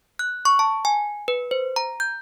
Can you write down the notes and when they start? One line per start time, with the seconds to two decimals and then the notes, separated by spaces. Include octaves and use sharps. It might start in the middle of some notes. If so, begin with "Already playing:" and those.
0.19 F#6
0.45 C#6
0.59 A5
0.85 G#5
1.28 B4
1.51 C5
1.76 A#5
2.00 G6